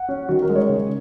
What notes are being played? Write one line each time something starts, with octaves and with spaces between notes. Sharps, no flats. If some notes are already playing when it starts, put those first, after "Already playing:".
Already playing: F#5
C#4
D#3 F#4
A#4
G#3
C#5
C#3